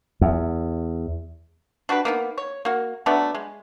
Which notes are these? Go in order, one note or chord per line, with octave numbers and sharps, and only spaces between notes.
E2
D4 F#4 G4 B4
A#3 B3 D#4
C#5
A#3 F#4
F#3 A3 B3 D4
G#3